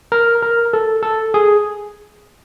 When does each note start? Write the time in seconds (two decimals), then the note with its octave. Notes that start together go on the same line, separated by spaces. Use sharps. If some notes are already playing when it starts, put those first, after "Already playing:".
0.12 A#4
0.43 A#4
0.73 A4
1.03 A4
1.34 G#4